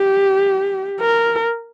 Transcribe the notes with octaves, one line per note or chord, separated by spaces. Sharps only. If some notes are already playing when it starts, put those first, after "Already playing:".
Already playing: G4
A#4